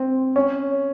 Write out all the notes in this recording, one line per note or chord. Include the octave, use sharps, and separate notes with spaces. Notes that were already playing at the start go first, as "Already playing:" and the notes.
Already playing: C4
C#4